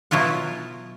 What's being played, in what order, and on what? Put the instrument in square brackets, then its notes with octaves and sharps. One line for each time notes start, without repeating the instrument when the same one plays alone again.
[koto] B2 F#3 E4 F4 F#5